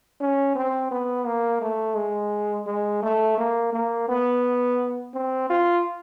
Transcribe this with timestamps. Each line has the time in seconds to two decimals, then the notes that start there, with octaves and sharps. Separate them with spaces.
0.20 C#4
0.55 C4
0.91 B3
1.26 A#3
1.61 A3
1.96 G#3
2.66 G#3
3.03 A3
3.38 A#3
3.73 A#3
4.08 B3
5.14 C4
5.50 F4